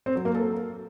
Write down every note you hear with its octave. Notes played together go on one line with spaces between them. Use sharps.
C4
F#3
A#3
A4